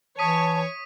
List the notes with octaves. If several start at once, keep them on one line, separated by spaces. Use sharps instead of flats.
E3 C#5 A5 D#6 B6 D#7